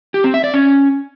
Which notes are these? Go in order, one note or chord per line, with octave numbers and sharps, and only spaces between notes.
G4
C4
E5
D5
C#4